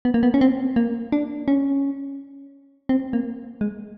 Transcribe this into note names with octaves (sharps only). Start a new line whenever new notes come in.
B3
A#3
B3
C#4
C4
A#3
D4
C#4
C4
A#3
G#3